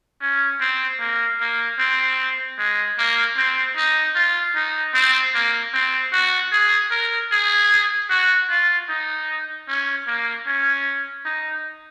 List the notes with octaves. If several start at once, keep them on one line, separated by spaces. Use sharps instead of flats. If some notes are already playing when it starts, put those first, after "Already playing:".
C#4
C4
A#3
A#3
C4
G#3
A#3
C4
D#4
F4
D#4
C4
A#3
C4
F#4
G#4
A#4
G#4
F#4
F4
D#4
C#4
A#3
C#4
D#4